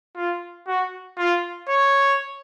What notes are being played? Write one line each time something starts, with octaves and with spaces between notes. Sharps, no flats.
F4
F#4
F4
C#5